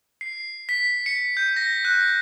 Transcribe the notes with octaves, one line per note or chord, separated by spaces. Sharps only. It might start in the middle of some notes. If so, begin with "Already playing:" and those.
C7
B6
C#7
G6
A#6
F#6